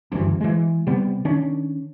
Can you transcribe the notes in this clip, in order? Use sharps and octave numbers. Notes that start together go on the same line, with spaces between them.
F#1 D2 G2 E3
E3 G#3
C3 G3 B3
D#3 C#4 D4